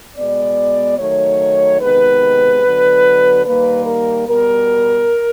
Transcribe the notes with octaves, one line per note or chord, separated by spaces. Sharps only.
B2 G#3 B3 D5
D#3 F#3 A3 C#5
C3 D#3 G#3 B3 B4
D3 F#3 B3
D#3 G3 A#3 B4
A#4
B2 G3 B3 A#4